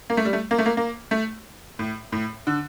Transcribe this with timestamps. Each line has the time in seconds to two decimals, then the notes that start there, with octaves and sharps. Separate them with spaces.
0.10 A#3
0.17 A3
0.25 G3
0.33 A3
0.51 A#3
0.58 A3
0.66 A#3
0.77 A#3
1.11 A3
1.79 A2
2.12 A2
2.47 D3